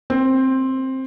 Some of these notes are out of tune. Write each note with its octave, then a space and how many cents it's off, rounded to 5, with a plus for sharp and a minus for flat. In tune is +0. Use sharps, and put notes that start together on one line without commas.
C4 +10